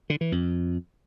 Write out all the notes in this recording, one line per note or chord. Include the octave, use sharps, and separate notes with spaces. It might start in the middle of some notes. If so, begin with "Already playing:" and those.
D3
E3
F2